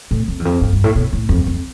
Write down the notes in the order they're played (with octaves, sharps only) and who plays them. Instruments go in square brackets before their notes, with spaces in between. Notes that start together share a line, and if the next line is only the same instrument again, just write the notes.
[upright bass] A2
F2
E2
F2
G2
G2
A2
B2
A2
F2
F2